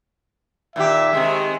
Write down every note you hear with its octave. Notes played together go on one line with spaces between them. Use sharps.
A#2 D#3 G4 E5
C3 D#3 G#3